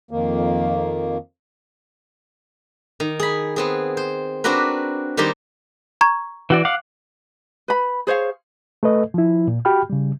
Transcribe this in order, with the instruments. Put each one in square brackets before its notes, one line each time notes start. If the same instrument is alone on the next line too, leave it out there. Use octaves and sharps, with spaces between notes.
[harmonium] F2 D#3 A#3
[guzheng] D#3
G#4 B5
B3 C4 G#4
C5
C4 D4 F#4 A#4 B4
D#3 G3 G4 A#4 C5
[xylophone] A#5 C#6 G#6
[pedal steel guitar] E3 F#4 D5
F5 F#5 D6
[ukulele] B4 B5
G#4 C5 C#5 F5
[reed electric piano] A3 A4 B4 D#5
F3 E4
A#2
F#4 G4 G5 B5 F6
C#3 G3